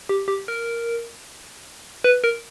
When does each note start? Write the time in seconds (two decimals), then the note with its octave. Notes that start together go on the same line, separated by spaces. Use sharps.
0.09 G4
0.28 G4
0.48 A#4
2.04 B4
2.24 A#4